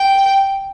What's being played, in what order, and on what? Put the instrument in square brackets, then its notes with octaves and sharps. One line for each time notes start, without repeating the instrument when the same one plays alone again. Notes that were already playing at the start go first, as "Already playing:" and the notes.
Already playing: [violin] G5